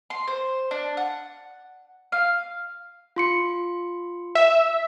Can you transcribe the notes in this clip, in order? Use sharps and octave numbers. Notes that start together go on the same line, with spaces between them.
C6
C5
D4
F#5
F5
F4 C6 C#7
E5